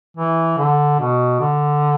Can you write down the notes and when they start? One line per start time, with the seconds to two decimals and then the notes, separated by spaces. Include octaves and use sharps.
0.17 E3
0.58 D3
0.99 B2
1.40 D3